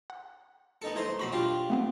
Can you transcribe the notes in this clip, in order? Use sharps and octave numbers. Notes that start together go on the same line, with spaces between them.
F#5
B3 D#4 A4 C#7
A3 E4 C5 A#5
B1 F#3 B5 C#6 A#6 C7
D4 F4 G4
A3 B3 C4